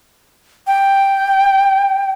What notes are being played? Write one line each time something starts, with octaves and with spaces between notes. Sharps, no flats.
G5